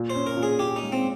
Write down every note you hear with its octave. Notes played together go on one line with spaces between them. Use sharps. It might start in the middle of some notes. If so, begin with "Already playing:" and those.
Already playing: A#2
C5
C#4
A#4
A#2
G#4
A#2 G4
D#4
G#3
C4